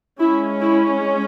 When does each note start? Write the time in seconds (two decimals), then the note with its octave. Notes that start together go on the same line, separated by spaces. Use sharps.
0.20 G#3 C#4 E4
0.61 E4